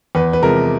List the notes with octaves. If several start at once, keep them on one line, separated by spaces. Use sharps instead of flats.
E2 B4
B4
C3 F3 G#3 A#4